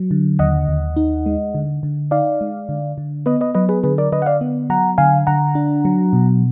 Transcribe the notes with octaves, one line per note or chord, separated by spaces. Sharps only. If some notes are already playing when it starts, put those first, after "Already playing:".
Already playing: F#3
D3
D#2 D#5 F#5
D#2
D#4
G#3
D3
D3
D#4 D5 F5
G#3
D3
D3
B3 B4 D#5
B4 D#5
F#3 B4 D#5
G#4 B4
D3 G#4 B4
A#4 D5
D3 B4 D#5
F#5
D5 F5
B3
F#3 F#5 A#5
D3 F5 G#5
D3 F#5 A#5
D4
F#3
B2